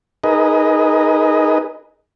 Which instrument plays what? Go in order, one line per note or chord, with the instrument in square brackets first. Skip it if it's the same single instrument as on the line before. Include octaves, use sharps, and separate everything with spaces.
[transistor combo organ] D#4 G#4 A#4 B4 D#5